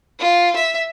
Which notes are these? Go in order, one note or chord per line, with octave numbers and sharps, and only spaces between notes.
F4
E5